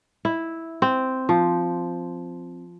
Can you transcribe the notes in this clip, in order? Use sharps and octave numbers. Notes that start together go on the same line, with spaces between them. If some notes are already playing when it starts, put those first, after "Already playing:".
E4
C4
F3